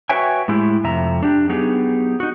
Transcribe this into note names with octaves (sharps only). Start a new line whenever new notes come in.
F#4 B4 C#5 E5 G5 G#5
A2 G#3 E4 G4
F2 C3 E5 A#5
D4 G4
F#3 B3 D#4 G4 G#4
D#4 F#4